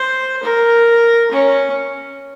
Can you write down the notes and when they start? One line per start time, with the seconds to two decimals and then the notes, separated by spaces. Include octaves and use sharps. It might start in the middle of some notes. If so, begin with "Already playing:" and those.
Already playing: C5
0.43 A#4
1.31 C#4